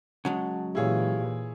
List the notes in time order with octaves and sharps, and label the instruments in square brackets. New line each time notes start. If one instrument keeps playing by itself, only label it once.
[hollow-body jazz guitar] C#3 F#3 G#3 [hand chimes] F#5 A5
[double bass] A#2 E3 [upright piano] E4 G#4 C#5 [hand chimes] G4 F5